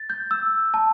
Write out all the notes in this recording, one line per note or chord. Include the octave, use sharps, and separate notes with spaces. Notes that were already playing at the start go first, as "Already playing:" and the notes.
Already playing: A6
G6
E6
A5